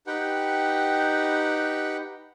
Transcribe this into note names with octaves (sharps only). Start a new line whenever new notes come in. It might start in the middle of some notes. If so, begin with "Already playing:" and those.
D#4 G4 B4 F#5 G5